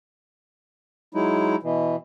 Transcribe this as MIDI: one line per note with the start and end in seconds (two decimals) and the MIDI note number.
1.14 1.56 54
1.14 1.56 56
1.14 1.56 63
1.14 1.56 64
1.63 1.96 47
1.63 1.96 52